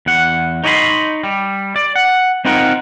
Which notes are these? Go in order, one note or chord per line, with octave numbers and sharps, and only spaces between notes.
E2 F#5
D#4 C#5 D#5 G5 B5 C6
G3
D5
F#5
C4 D#4 F4 A#4 F#5